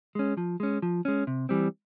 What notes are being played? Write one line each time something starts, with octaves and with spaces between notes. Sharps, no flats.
G#3 C#4
F3
G#3 C#4
F3
G#3 C#4
C3
E3 G3 C4